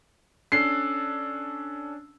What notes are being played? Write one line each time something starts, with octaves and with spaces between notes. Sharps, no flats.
C#4 D4 A4 C7